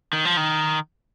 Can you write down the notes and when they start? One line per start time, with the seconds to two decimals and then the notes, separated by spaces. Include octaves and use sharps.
0.13 D#3
0.25 F3
0.37 D#3